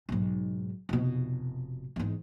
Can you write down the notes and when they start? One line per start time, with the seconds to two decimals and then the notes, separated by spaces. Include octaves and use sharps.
0.09 B1 G#2
0.89 F1 B2
1.96 E2 G#2